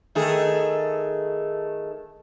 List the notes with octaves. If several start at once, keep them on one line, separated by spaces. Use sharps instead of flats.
D#3 A3 G#4